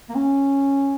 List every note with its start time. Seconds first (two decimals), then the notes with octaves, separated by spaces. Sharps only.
0.10 A#3
0.15 C#4